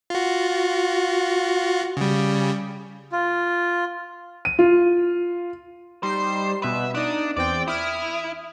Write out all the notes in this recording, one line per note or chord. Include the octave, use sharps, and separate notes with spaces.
F4 F#4
C#3 G3
F4
D#7
F4
G3 D#4 C5 C7
B2 B4 E5
D4 D#4 D5 D#6
E2 C4 D5 G5
E4 D#6 F6